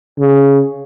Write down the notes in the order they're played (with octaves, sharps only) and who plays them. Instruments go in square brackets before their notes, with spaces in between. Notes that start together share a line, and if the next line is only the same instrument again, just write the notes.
[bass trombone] C#3